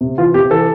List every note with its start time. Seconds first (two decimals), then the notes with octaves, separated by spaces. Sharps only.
0.01 C3
0.18 E3 F4
0.34 C3 G4
0.51 E3 A4